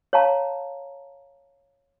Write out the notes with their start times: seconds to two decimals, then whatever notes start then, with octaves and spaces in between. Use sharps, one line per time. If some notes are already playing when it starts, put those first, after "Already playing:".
0.13 C#5 F5 A5 A#5